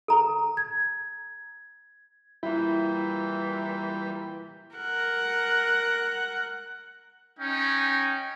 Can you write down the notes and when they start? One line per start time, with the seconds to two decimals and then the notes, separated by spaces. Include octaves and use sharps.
0.08 A4 A#5
0.57 G#6
2.43 A#2 E3 G3 E4 G5 B5
4.76 A#4 F#5
7.39 C#4 D#4 G5